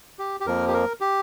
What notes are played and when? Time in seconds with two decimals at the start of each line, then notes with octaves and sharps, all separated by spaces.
0.19 G4
0.40 G4
0.46 F2 F3 A#3 A#4
0.68 G4
0.74 A#4
1.01 G4